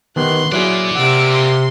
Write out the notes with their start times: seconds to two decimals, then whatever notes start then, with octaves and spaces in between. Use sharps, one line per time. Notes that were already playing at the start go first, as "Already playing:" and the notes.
0.16 D#3 B3 G4 C6 F#6
0.52 F#3 A#3 E4 G#4 D5
0.95 C3 F#5 E6 D7
1.32 C6